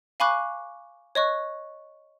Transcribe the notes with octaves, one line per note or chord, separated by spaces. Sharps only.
F5 G#5 B5 C#6 D6 F#6
C#5 D#5 C#6 F#6